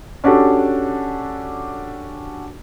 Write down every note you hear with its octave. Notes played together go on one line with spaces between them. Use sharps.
C#4 D4 F#4 G4 A4